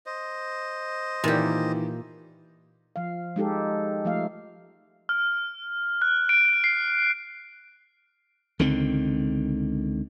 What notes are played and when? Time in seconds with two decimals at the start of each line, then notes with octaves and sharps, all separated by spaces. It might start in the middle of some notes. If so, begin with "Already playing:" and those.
0.06 C5 D#5
1.24 A#2 D#3 E3 G4
2.96 F3 F5
3.36 G#3 D#4 G4 A4
4.05 F3 A3 F5
5.09 F6
6.02 F#6
6.29 D7
6.64 C7
8.59 C#2 D3 D#3 C4